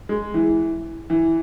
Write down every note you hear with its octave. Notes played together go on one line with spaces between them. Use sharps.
G#3
E3
E3